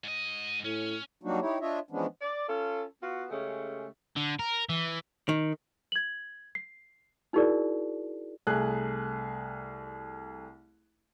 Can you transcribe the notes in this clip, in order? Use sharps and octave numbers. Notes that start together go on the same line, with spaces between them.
G#2 D#5
A2 C#4
F#3 G3 A#3 D4 D#4 F#4
D#4 E4 G4 C#5
D4 F4 C#5 D#5 E5
E3 F3 G#3 B3 C#4 D4
D5
C#4 F4 A4
B3 F4 F#4
C#3 G#3 A3 C#4 G4
D3
A#4
E3
D#3
G#6 F#7
C7
D#4 E4 F#4 G#4 A#4 D5
C2 A3 G#4 F#6